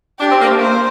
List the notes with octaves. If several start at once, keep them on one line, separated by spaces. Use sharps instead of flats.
D4 G4
C4
A#3
A3
A#3 C5